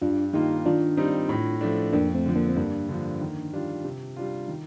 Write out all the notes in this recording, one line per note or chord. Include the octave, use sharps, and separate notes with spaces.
G2 D4 F4
D#3 A#3 D#4 F4 G4
D#3 D4 F4
G3 C4 D#4
A2
F3 A3 D4
F2 A#3 D4
A3 C4
D3 F3
A#3 D4
C4
G2 A#3 D4
D3 F3
D#3
G3 D4 F4
C3
G3 D4 F4
D#3